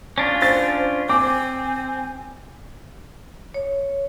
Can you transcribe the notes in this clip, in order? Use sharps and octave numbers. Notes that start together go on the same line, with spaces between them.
C#4 D4 F4
C5 A6
C4 G#5 D6
C#5